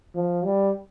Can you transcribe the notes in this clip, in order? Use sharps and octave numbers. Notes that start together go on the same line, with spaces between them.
F3
G3